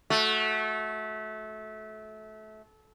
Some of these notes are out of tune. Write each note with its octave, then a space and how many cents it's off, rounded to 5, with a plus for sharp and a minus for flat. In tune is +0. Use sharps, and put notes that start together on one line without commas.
A3 -25 F#4 -15